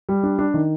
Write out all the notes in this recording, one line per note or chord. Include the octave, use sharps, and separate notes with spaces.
G3
D4
D4
D#3